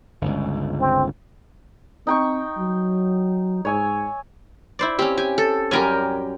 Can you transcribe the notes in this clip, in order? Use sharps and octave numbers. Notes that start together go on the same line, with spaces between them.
G1 C#2
C4
C4 D#4 G5 C#6
F#3
G#2 C#5 G#5 E6
E4 C5 D5
C4 C#4 G4
G4 G#5
A4
F#2 G3 C#4 G4 A#4 G#5